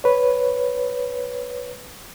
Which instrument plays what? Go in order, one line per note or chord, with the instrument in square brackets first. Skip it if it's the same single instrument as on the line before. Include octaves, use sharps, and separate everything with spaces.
[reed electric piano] B4 C#5